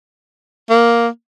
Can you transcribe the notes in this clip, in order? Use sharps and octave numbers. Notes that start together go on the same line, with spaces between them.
A#3